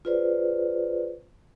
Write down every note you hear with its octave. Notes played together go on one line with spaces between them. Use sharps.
F4 G#4 B4 C5 D5